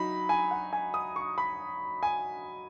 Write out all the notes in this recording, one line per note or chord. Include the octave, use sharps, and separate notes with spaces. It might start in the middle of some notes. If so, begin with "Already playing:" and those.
Already playing: F#3 D#4 B5
G#5
F#5
G#5
D#6
C#6
B5
G#5